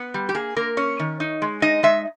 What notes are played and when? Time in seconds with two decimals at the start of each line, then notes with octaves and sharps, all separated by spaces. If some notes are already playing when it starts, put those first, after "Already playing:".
Already playing: B3
0.14 G3
0.29 G4
0.35 A#3 G#4
0.56 A#3 A#4
0.77 C#4 C#5
0.99 D#3
1.20 D#4
1.42 G#3
1.62 D#4 D#5
1.83 G#3 E5